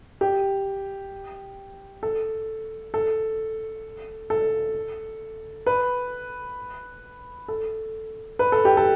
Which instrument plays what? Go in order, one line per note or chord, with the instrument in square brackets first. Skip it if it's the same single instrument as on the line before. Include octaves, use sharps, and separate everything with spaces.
[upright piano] G4
A4
A4
A4
B4
A4
B4
A4
G4
A4